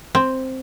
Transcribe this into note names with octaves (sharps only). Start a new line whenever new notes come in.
C4